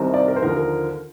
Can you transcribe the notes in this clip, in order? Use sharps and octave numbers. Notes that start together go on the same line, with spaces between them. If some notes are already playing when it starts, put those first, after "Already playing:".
Already playing: C2 C3 D#3 G3 C4
D5
A#4
C5
D#2 D3 F3 A#4
A#4